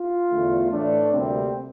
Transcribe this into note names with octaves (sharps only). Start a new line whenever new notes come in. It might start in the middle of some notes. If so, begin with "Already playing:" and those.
Already playing: F4
E2 D3 A3
A2 E3 A3 D4
D2 C3 G3 A#3 C4